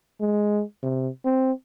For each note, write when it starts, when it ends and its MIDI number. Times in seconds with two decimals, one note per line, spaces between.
0.21 0.62 56
0.83 1.08 48
1.25 1.52 60